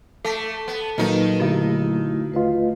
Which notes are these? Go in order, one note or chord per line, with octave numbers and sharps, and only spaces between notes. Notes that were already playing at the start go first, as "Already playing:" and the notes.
A3 A4 A5 B6
B3
A#2 D#3 F#3 A#3 D#4 B4
D3 A3 E4 F#4
D#2 A3 F4 B4 D#5